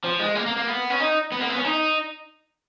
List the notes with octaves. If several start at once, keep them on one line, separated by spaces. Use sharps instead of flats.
F3
G#3
A#3
A#3
A#3
B3
C#4
D#4
B3
A#3
B3
C#4
D#4